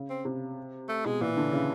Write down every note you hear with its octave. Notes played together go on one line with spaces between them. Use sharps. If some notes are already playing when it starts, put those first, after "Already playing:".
Already playing: C#3
C4
C3
A3
B2 G#3
A#2 E3
D3
C#3